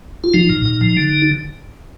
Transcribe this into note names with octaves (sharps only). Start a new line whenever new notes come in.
F4
F3 D#4
A#2
A#2
F3
D3